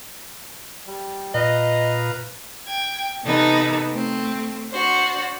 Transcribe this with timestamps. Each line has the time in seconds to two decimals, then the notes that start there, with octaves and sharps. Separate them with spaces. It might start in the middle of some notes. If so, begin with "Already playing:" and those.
0.87 G3
1.34 A#2 B4 D#5 F5 A#5
2.67 G5 G#6
3.24 C3 E3 B3 D#4 A4
3.91 A3 C4
4.72 D4 F#4 C5